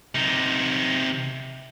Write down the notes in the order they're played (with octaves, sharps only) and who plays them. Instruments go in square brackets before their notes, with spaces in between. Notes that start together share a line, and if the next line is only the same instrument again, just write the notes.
[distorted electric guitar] C3 D#4